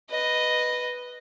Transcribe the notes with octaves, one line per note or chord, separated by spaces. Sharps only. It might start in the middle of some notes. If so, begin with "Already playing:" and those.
B4 D#5